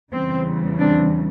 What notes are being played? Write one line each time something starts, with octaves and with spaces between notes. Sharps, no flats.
E2 C#3 E3 G3 C4
C4 D4